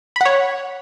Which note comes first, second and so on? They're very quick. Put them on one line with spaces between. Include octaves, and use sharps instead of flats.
B5 F#5 C#5